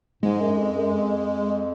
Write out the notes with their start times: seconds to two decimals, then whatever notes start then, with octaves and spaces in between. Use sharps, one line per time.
0.23 G#2 G#3
0.40 F#2
0.58 F2
0.76 F#2
0.93 F2